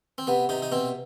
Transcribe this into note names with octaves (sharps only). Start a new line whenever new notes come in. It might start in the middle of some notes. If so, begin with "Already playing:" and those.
C4
C3 B3
C3 D#4
D#4
B2 C4